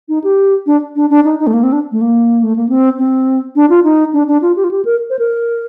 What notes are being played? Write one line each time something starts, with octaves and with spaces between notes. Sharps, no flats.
D#4
G4
D4
D4
D4
D#4
D#4
A3
A#3
C4
D4
A3
A#3
A3
A#3
C4
C4
D4
F4
D#4
D4
D4
F4
G4
F4
G4
A#4
C5
A#4